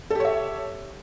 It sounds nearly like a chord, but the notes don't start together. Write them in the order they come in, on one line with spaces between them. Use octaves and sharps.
A4 G4 C#5 E5